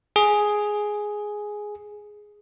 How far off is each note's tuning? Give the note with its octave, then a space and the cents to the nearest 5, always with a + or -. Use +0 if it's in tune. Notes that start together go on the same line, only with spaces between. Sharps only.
G#4 +5